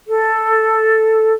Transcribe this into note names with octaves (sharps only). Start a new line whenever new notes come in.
A4